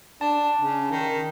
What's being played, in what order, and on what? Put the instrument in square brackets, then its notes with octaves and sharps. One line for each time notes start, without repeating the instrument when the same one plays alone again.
[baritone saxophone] D4 [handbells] A5
[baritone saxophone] C#3
D#3